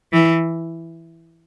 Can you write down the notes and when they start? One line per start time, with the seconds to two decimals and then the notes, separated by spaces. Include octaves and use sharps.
0.12 E3